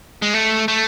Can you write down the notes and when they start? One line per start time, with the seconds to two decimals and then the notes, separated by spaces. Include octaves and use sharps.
0.22 G#3
0.34 A3
0.68 A3